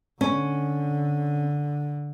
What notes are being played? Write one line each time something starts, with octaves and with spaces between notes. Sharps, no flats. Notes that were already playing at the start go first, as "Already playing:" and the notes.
D3 C#4